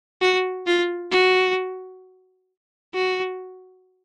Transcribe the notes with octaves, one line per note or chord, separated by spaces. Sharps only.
F#4
F4
F#4
F#4